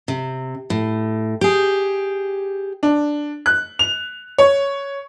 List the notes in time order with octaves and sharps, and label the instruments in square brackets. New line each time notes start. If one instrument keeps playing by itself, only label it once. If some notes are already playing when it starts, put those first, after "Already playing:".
[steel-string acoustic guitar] C3
A2
G4 G#4
[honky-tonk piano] D4
F#6
F7
C#5